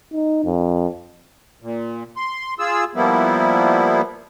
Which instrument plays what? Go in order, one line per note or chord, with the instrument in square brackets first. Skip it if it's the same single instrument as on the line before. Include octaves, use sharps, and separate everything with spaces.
[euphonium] D#4
F2
[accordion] A#2
C6
F4 G#4 E6
F3 G3 A#3 B3 E4